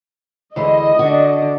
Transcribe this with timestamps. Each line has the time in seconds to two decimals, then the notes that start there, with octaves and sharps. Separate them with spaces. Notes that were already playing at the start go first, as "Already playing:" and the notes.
0.56 D2 E3 G#3 D#5
0.99 D3 D4 F#4